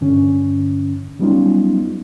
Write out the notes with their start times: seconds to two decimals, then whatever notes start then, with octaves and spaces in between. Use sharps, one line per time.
0.01 G2 D3 C#4
1.19 F#3 G3 B3 C#4 D#4 F4